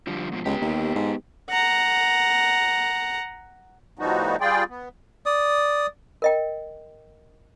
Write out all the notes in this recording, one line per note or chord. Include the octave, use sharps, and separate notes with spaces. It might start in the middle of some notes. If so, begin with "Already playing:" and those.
D3 F3 G3
G#2 B2 F3
C#2 B3 G4
D#2
G#2
F#5 A#5
A2 F3 G3 B3 D#4 F#4
G3 F4 G#4 D5 G5
B3
D5 D#6
A#4 D#5 G5